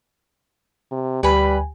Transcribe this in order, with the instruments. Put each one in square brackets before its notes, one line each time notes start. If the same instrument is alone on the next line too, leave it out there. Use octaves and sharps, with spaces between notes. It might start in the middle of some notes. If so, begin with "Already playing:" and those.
[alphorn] C3
[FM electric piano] D2 G4 G#5 [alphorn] G3 [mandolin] B4 B5